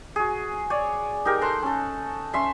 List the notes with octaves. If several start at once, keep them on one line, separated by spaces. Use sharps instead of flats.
F#4 G#4
C#5 D5 G#5
D#4 G4 G#4 A#4
A4 F#5 A#5 C6
C#4 A4
C#4 E5 C6